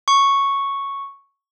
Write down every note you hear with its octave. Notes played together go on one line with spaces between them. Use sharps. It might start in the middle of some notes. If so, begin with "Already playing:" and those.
C#6